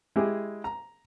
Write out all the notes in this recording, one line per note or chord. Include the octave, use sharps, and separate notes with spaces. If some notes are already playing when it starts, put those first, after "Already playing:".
G#3 E4 G4 G#4
A#5